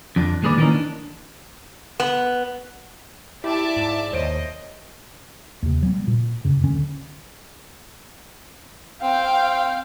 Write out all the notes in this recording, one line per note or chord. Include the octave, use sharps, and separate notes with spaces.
F2 D4
D#2 G#3 G#4 B4 D5
D#3 E3 G3 A#3 C#4 D#4
D4
B3
E4 G4 D5 E5 A5
G#2
D#2 C5 C#5 D#5 D7
D#2 C3
F#3 G3 B3
G3
A#2
F#2 C#3
D1 D3 C#4
C4 F5 G5